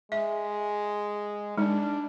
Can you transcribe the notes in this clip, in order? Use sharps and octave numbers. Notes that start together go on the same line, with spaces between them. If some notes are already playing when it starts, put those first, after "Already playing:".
G#3 E5
G#3 D4 D#4